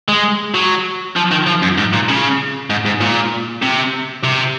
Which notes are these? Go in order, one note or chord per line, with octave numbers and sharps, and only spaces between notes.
G#3
F#3
F3
D#3
F3
F#2
G#2
A#2
C#3
G#2
G#2
A#2
C3
C3